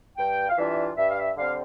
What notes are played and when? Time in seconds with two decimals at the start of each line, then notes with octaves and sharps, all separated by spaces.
0.17 G2 G5
0.49 F5
0.58 E3 G3 D4 F4 E5
0.97 G2 E5
1.11 F5
1.18 E5
1.37 D3 G3 C4 F5